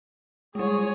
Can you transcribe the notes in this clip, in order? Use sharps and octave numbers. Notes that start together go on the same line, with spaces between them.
G3 G#3 G#4 C#5